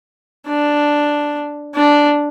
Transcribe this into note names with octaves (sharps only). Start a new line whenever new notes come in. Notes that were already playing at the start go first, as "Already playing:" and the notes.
D4
D4